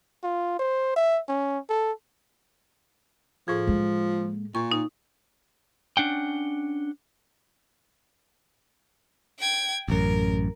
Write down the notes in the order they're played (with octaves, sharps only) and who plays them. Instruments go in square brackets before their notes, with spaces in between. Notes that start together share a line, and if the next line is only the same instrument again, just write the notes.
[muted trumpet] F4
C5
E5
C#4
A4
[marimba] A2 G#4 [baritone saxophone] F3
[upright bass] G#3 A#3
[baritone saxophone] A#2 [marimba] C#6
[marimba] D#4
[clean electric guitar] C#4 D4 F#5 G5
[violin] G5 G#6
[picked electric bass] A1 F#2 [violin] A#4